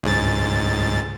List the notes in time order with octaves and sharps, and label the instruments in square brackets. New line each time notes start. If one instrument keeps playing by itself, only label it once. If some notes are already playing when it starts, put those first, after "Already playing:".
[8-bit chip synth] C#2 G#2 A6